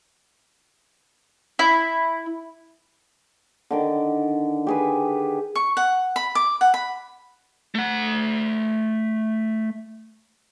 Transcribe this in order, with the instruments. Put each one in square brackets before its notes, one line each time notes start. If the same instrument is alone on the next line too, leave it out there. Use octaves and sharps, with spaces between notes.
[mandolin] E4
[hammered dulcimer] D3 D#3 D6
G4 G#4 B4
[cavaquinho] C#6
F#5
B5
D6
F#5
B5
[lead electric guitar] A3 F#5